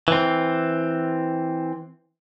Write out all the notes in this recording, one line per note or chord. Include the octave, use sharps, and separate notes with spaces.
E3 C4